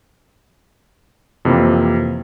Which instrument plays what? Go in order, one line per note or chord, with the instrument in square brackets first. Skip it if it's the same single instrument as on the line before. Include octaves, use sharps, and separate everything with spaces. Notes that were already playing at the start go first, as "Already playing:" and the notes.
[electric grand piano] F2 C3 E3 A#3 C4